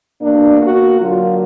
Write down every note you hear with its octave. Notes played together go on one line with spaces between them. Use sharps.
B2 A#3 D4
F#4
D3 F#3 A#3 F4